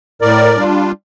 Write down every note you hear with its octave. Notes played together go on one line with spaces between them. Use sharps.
A2 A#4 D5
G3 D4 F4